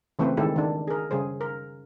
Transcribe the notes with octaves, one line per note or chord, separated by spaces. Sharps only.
C#3 E3 A3 C4 B4 C5
D#3 G#3 E4 G4 A4
D#3 D4
G#4 A#4
C#3 G3 G#4 C5
A#4